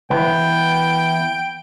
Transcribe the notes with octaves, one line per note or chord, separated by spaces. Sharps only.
E3 B3 G5